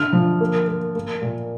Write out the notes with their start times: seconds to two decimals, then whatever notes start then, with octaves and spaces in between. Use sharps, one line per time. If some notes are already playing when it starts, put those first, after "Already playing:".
Already playing: D3 F6
0.13 F3
0.41 A#3
0.68 A#3
0.95 A#3
1.22 A#2